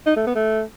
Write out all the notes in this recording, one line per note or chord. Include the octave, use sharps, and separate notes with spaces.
D#4
A3
B3
A3